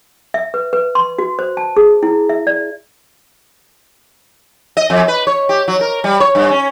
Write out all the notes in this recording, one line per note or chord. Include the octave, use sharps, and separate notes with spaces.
E5
B4
B4
C6
F#4
C5
A5
G#4
E4
E5
D5
D#5
F2
B4
C#5
G4
F#3
A#4
G3
C#5
G2
C#4